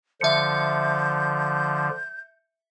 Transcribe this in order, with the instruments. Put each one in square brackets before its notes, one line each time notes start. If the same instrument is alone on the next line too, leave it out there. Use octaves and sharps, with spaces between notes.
[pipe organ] D3 F3 [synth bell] E5 C#7 [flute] G6